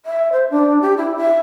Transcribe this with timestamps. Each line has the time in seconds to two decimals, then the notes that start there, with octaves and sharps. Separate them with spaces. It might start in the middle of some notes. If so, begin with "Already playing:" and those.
0.06 E5
0.32 C5
0.50 D4
0.82 G4
0.97 E4
1.17 E5